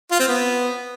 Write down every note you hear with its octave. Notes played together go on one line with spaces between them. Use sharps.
F4
C4
B3